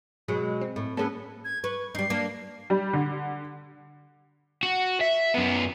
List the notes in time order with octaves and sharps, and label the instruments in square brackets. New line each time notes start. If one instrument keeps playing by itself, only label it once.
[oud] B2 F#3 G#3
[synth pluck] C4
[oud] A2
[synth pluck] A#3 C#4 G#4 [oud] B3 A4
[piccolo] G#6
[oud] B4 [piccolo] C#6
[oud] G3 D#4 [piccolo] C7
[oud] A#3 D4
[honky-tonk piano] G3
D3
[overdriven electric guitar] F#4
E5
F#2 B3